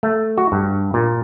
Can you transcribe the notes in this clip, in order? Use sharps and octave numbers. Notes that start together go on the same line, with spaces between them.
A3
F#4
G2
A#2